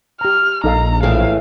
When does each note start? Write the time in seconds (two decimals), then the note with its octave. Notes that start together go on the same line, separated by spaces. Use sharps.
0.21 G4 A#5 F6
0.64 A#1 D#4 A4 F5 A#5
1.03 A2 E3 G#4 F5